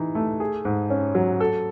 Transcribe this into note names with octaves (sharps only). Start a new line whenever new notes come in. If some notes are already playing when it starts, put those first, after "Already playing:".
Already playing: E3 D#4
A3
G#4
G#2
C#4
F#3
A4